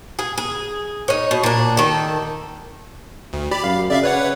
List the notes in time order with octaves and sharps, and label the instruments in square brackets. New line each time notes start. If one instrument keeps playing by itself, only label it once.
[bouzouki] G#4
G#4
D#4 C#5
B2
A#2 D4
D#3 A4
[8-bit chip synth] D2
G4 D5 B5
[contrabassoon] F#2 [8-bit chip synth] F5
[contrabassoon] C#3 [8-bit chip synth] D5 E5 F5
[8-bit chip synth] B4 C#5 F#5